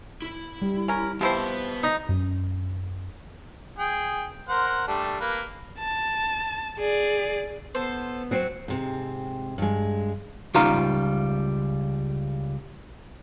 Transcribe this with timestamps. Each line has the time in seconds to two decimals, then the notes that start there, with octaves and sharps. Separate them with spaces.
0.22 E4
0.62 G3
0.88 C#4 A#4
1.21 F3 B3 E4 G4 C5 A5
1.83 D#4
2.09 F#2 C#4
3.79 G#4 G5
4.49 A#4 C5 F#5
4.87 G3 A3 D4
5.20 A#3 B4
5.80 A5
6.79 G#4 D5
7.75 B3 A4 C5
8.31 F#3 C4
8.68 G#2 C3 C4
9.58 G2 G#3
10.54 C#2 G3 D#4 F4 F5 A#5